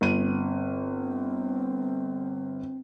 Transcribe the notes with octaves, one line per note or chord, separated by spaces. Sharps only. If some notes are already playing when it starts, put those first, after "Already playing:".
G1 C4 D#7